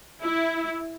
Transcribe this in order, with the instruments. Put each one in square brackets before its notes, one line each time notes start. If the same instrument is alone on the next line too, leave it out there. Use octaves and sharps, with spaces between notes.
[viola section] E4